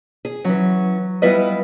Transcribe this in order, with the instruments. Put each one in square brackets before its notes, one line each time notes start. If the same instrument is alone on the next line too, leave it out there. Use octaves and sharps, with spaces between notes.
[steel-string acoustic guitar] G#4
[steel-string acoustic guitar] E3 C#4 [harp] F#3
[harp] G3 B3 F4 [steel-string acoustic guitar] E4 B4 D#5